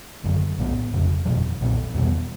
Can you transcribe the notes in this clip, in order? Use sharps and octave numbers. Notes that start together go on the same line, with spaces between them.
G#1 F#2 D3
B1 A2 F#3 B3
F1 F2 C#3
F#1 E2 B2 F#3
B1 A#2 G3 C4
E2 B2 G3 B3